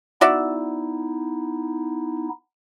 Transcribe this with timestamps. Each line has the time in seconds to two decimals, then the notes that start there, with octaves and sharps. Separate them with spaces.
0.21 B3 D#4 E4 F#4 D5 E5